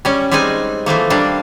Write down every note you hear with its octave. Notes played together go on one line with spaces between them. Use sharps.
G3 C#4
G3 G#3 C4 D#4 G#5
E3 F3 A3 A#3
G3 A#3 D4